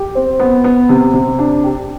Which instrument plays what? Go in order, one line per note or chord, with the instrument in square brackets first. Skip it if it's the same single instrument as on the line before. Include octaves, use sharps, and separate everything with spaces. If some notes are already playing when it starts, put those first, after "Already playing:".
Already playing: [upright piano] G4
C4
B3
B3
C3
C3
D4
G4